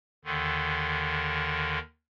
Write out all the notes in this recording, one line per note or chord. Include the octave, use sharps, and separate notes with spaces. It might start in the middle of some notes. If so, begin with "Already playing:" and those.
D#2 D3 D#3